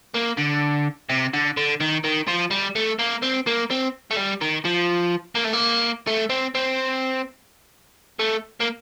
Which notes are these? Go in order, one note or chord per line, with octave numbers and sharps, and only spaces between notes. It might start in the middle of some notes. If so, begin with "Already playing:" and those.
A#3
D3
C3
D3
D3
D#3
D#3
F3
G3
A3
A#3
C4
A#3
C4
A3
G3
D#3
F3
A#3
A3
A#3
A3
C4
C4
A3
A#3